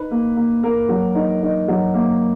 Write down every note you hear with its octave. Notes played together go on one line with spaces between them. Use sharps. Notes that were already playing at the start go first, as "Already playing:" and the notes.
Already playing: D#4 B4
A#3
A#3
A#3 A#4
F#3
D#4
D#4
F#3
A#3